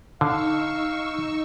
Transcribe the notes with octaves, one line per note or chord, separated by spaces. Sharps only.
D3 D#4 F5 C#6 E6